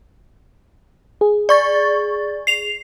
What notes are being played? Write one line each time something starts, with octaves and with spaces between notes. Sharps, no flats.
G#4
D5 C#6 A6
C7 F7